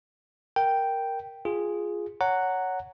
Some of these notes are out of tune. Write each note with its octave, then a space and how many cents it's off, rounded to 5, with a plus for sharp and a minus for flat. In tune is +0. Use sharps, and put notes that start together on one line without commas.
A#4 +0 G5 -5
F4 +0 G#4 +0
C#5 +10 F#5 +0 A#5 -15